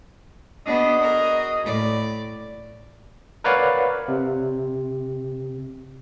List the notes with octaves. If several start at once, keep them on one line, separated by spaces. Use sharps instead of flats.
B3 D4 F#4 G#4 D#5
A#4
A2 D5
A#4 B4 C#5 D5 F5 F#5
C3